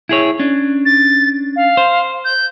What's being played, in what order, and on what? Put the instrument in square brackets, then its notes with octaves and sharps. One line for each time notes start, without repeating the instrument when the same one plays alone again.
[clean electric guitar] E4 G#4 C#5
C#4 D4
[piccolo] A6
F5
[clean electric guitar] C5
[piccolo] G6